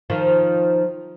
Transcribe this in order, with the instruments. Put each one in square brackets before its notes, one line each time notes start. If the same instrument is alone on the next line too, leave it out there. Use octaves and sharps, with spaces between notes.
[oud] D#3 F3